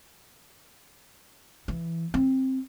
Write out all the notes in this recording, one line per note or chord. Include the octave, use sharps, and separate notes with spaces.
E3
C4